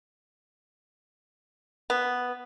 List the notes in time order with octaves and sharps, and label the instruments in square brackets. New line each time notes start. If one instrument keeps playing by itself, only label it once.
[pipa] B3